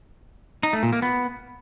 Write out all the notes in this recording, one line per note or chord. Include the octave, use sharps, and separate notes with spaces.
D#4
A3
A#2
A#3
B3